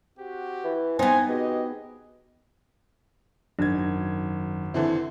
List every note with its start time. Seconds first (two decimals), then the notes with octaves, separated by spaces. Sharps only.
0.19 C4 F#4 G4
0.64 E3
0.99 B3 C4 D#4 G#5
1.29 B2 G4 G#4 D#5
3.59 G#1 F#2 D#3 D4 G#6
4.74 D3 E3 C4 E4